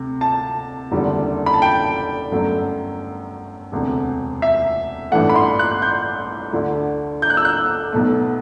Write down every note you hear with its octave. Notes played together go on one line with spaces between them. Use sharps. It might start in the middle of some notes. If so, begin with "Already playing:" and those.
Already playing: D2 C3
A5
F#1 E2 D3 G3
B5
A5
G5
G1 F#2 F#3 A3
E1 D2 C3
E5
A1 G2 E3 A3 F#5
B5
C6
F#6
G6
D2 D3 A3
G6
F#6
E6
F#6
B1 B2 A3